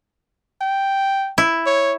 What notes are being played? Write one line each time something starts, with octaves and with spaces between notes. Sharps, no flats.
G5
E4
C#5